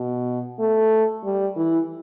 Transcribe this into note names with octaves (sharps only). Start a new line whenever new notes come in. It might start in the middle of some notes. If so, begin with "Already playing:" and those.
Already playing: B2
A3
G3
E3